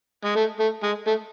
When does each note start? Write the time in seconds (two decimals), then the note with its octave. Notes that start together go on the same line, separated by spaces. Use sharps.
0.25 G#3
0.36 A3
0.60 A3
0.83 G#3
1.07 A3